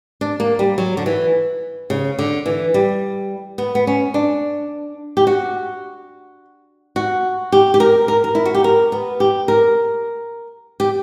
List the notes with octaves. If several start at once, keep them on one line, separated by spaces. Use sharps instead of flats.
D4
A#3
G3
F#3
D3
E3
C#3
D3
E3
G3
B3
B3
C#4
D4
G4
F#4
F#4
G4
G4
A#4
A#4
A#4
E4
F#4
G4
A#4
B3
G4
A#4
G4